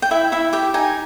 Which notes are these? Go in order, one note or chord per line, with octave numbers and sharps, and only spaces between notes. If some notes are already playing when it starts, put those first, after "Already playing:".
G5
E4 E5
E4 E5
G4 G5
D#4 G#5